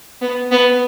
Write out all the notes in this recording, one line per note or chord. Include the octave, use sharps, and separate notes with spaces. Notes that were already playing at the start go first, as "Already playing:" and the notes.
B3
B3